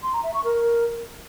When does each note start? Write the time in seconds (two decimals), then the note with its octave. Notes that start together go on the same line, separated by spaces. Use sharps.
0.03 C6
0.13 A#5
0.24 E5
0.34 C#6
0.44 A#4